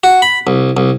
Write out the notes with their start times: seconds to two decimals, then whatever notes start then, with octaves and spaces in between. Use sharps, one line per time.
0.04 F#4
0.22 B5
0.47 C2
0.77 C2